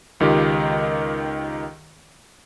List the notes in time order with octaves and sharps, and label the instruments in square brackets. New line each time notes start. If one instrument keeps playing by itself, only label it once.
[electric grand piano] C#2 D#3 F4 G4 D#5